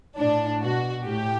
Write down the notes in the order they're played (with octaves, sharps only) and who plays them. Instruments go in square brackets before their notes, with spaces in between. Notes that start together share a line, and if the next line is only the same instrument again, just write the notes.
[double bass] A2 [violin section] D4
[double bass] B2 [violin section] F#4
[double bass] A2 [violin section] G4